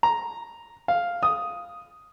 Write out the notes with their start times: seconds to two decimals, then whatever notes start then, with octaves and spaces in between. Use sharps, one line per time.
0.03 A#5
0.88 F5
1.23 D#6